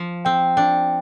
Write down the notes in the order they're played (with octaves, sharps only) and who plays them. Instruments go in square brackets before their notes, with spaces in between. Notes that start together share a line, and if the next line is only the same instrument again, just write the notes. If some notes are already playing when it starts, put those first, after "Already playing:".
Already playing: [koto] F3
[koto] C4 [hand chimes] G5
[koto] D4 [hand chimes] G5